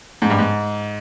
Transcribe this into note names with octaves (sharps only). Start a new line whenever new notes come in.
G#2
G2
G#2